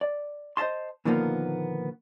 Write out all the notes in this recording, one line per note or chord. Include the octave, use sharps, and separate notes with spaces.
D5
C5 D#5 E5 A5 C6
A#2 D3 D#3 F3 A#3 B3